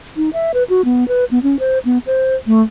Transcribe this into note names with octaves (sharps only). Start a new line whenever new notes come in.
D#4
E5
B4
F#4
B3
B4
B3
C#4
C5
B3
C5
A3